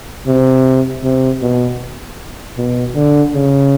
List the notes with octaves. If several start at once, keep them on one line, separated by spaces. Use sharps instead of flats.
C3
C3
B2
B2
D3
C#3